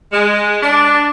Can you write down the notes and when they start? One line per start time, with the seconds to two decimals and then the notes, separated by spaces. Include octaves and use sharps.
0.13 G#3
0.62 D4